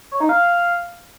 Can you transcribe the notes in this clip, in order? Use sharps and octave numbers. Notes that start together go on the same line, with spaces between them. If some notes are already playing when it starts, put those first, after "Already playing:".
C#5
D#4
F5